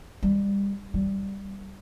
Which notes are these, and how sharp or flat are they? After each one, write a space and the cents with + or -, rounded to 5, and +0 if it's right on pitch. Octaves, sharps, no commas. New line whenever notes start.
G3 +25
G3 +0